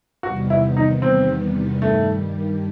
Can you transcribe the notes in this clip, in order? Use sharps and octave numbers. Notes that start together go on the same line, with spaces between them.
E2 C3 D#3 G3 B3 F#4
E4
D#4
C4
G2 D#3 G3 A3